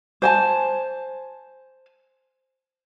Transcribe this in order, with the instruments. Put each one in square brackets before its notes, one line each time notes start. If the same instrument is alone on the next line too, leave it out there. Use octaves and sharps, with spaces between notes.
[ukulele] C5 G#5 A5